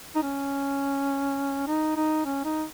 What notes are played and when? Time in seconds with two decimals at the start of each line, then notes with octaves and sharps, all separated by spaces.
0.15 D#4
0.22 C#4
1.67 D#4
1.96 D#4
2.25 C#4
2.44 D#4